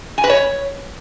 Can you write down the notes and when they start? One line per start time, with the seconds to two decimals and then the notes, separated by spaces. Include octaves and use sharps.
0.18 G#5
0.24 B4
0.30 C#5